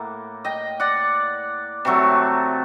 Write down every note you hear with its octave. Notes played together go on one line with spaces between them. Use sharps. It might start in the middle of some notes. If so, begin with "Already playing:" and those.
Already playing: A2 A#3 F#5
D#5 G5
D5 F#5
C3 F#3 A3